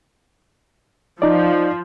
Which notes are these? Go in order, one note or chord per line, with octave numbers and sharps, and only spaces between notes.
F3 D#4 D5